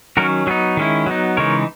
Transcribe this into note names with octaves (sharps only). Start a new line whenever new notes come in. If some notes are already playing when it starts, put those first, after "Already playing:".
D#3 F#3 C#4 F#4 A#4
F#3 B3 D#4 G#4
D#3 G#3 C#4 E4
F#3 B3 D#4
C#3 E3 G#3 D#4 A#4 C#5